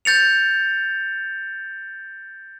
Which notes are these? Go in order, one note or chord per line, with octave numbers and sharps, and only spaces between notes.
G6 A6 C#7 F7